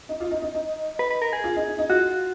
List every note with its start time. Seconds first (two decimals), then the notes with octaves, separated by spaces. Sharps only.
0.09 D#4
0.20 F4
0.31 D#4
0.42 D#4
0.55 D#4
0.99 B4
1.11 B4
1.22 A#4
1.33 G#4
1.44 F4
1.56 D#4
1.68 D#4
1.78 D#4
1.90 F4 F#4